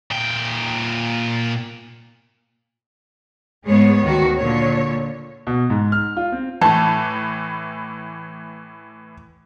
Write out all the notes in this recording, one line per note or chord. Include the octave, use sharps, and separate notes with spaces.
A#2 G5
G#2 G#3 A3 B3 G#4 C#5
D2 D#3 F#4
A#2 D3 C#5
B2
G#2
F6
F4
C4
A2 E3 A5